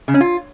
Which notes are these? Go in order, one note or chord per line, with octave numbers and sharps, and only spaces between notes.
C#3
C#4
F4